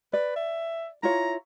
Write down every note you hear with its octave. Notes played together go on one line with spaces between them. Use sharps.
B4 D5
E5
E4 F4 C#5 A#5